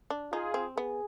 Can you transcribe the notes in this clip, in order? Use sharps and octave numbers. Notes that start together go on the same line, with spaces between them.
D4
D#4 F4 G#4
C4
B3 G#4